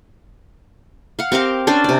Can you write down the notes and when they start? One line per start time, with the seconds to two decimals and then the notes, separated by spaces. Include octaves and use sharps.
1.19 F5 F#5
1.32 C4 G4 A#4 F5
1.67 C#4 D4 C5 D5
1.84 C3 D5